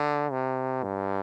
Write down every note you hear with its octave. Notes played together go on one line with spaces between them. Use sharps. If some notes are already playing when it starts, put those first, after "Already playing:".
Already playing: D3
C3
G2